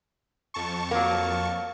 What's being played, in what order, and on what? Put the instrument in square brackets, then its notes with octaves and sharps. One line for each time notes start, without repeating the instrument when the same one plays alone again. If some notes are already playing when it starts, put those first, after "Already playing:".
[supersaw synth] F2 A5 C#6
[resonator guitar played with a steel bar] F#3 A#3